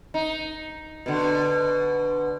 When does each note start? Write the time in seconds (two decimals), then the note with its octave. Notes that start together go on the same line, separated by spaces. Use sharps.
0.14 D#4
1.06 B2 D3